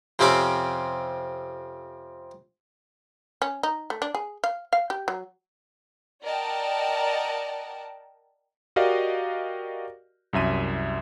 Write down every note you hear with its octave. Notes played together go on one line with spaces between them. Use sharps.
F2 C3 C4 C#4 B5 D6
C#4
D#4
A3
D4
G#4
F5
F5
G4
F#3
A#4 D5 D#5 F#5 G5 A5
F#4 G4 A#4 D5 D#5 F5
C2 F#2 E5 D#7